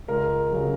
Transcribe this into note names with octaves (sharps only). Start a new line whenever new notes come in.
C#2 A#4
C#3 F#3